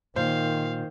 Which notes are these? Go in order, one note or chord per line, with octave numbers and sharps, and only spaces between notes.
A#2 D#3 C5 F5